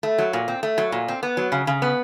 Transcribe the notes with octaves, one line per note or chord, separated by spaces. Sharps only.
A3
F#3
A#2
C4
A3
F#3
A#2
C4
B3
F#3
C#3
C#3
B3